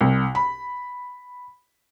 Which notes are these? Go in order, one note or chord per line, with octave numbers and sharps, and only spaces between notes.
C2
B5